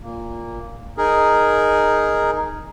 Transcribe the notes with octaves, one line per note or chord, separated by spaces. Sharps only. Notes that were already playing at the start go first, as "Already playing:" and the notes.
A#2 A#3
D#4 G#4 A#4